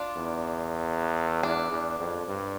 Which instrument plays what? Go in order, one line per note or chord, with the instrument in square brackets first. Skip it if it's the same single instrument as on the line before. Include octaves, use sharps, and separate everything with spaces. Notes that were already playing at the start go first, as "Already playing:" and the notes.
Already playing: [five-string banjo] D4 F4
[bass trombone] E2
[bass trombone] E2 [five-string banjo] D4
[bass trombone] E2
F2
G2